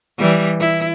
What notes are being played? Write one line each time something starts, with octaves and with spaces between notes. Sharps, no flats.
E3 G3
E4